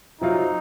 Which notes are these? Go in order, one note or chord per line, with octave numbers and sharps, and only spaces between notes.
C3 F#3 C4 D#4 F4